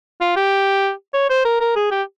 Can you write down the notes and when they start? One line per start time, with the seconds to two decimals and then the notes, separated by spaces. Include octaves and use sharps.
0.21 F4
0.36 G4
1.14 C#5
1.30 C5
1.45 A#4
1.60 A#4
1.76 G#4
1.91 G4